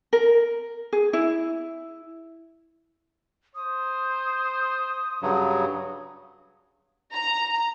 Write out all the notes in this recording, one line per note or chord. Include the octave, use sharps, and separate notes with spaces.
A#4
G#4
E4
C5 D#6
G2 C#3 F#3
A#5